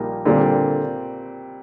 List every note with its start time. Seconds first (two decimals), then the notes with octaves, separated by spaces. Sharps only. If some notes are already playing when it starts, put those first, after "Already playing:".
Already playing: A#1 A#2 G3 A#3 D#4
0.25 A#2 D3 G3 C4